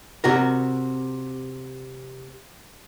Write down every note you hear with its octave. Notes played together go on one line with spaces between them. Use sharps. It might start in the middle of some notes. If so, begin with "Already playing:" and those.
C3 F#4 A#4